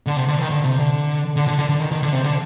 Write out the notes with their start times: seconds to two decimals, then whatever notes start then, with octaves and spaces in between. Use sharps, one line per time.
0.07 D3
0.17 C3
0.28 D3
0.39 D#3
0.50 D3
0.64 C3
0.79 D3
1.36 D3
1.47 D3
1.59 D3
1.69 D3
1.80 D#3
1.91 D#3
2.03 D3
2.13 C3
2.24 D3